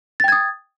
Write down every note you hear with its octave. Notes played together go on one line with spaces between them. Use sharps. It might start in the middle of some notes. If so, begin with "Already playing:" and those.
G5 D#6 G#6 A6